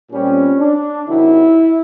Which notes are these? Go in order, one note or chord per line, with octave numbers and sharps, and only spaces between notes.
A#2 G3 C4 C#4
D4
C3 D#3 F#3 E4